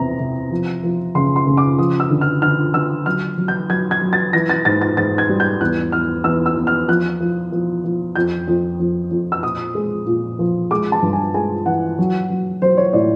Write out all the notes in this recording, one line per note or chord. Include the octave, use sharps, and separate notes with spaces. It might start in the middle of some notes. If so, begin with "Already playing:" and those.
Already playing: E2 C3 A#5
C3
F3
F3
C#3 C6
C6
C#3
D6
F3 D#6
E6
D3
F6
D3 F6
D3 E6
F#3 F6
F#3
G6
F#3 G#6
G#6
F#3
A6
E3 A#6
A6
G#2 A6
A6
G#2 A6
G#6
G3
G6
E2 F#6
E2 F6
E2 E6
E6
E2
F6
F3 F#6
F3
F3
F3
F2 G6
F2
F2
F2
E6
A#2 D#6
G#3
A#2
F3
G#3 D6
A5
G2
G#5
G#3 G#5
E3 F#5
F#3
F#3
F#3 C5
C#5
A2 D5